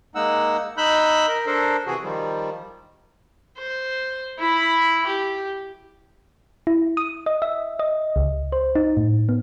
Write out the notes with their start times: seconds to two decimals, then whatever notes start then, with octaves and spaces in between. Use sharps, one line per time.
0.15 G#3 A#3 D#4 F#5 E6
0.78 D#4 B5 E6 F#6 G6
1.28 A#4
1.47 D4 A4 A#4 C5
1.87 C3 E3 F#4 G#4
2.02 D#3 F3 G3
3.58 C5
4.39 E4 B5
5.06 G4
6.67 E4
6.97 D#6
7.26 D#5
7.42 E5
7.79 D#5
8.16 C#2
8.52 C5
8.75 D#4
8.97 A2
9.29 B3